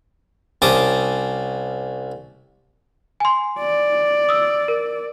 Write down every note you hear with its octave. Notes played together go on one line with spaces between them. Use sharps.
C2 C#4 C5 A5 D6 D#6
G#5 C6
D5
D#6 E6
A#4